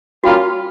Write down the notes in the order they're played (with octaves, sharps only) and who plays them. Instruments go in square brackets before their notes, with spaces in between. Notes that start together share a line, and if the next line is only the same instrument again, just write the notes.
[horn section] G3 A#3 C#4 F4 [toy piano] F#4